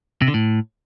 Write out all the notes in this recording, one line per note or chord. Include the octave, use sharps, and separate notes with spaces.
C3
D3
A2